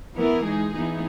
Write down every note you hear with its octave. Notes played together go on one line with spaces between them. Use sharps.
E3 B3 E4 A#4
G#3 D#4 G#4
E3 B3 D#4 G#4